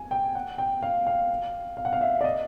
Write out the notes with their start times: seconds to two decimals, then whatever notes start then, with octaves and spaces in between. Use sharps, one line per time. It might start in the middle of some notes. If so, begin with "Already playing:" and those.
Already playing: G#5
0.11 G5
0.35 F#5
0.58 G5
0.83 F5
1.07 F5
1.77 F5
1.85 F#5
1.93 F5
2.01 E5
2.21 D5
2.24 D#5